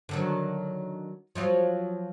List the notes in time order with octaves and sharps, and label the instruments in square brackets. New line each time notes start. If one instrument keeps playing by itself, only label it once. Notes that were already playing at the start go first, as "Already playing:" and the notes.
[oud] D3 D#3 F#3
F3 F#3 F4